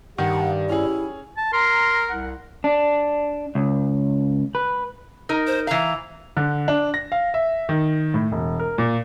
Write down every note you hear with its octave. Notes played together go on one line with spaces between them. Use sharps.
G2 D#3 G4 F#5
C#4 E4 G#4
A5
A#4 A#5 C6
C2 F#5
D4
C#2
B4
D#4 A#4
C5
E3 F5 A#5
D3
D4
A#6
F5
E5
D#3
A2
E1
A#4
A#2